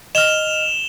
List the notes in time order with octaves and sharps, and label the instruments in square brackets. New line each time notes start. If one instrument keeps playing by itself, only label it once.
[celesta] D#5 F6 [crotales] E7 F7 G7